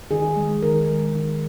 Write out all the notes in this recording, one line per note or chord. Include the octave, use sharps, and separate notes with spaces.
D#3 G#4
G#3
D#3 A#4
G#3
D#3